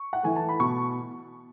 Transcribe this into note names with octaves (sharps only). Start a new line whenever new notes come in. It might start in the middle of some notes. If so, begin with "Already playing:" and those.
Already playing: C#6
F#5
E3 A3 G#5
A5
B5
B2 C#6